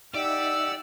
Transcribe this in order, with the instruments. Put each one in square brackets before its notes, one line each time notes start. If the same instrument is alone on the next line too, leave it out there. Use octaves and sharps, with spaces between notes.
[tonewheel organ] D#4 E5 [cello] G4 F#5 [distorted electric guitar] D5 [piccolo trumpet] E6